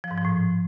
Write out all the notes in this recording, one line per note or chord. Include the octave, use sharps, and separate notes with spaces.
F3
G#2
F3
A2